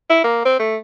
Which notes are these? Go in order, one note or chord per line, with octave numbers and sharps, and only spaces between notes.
E4
A#3
C4
A3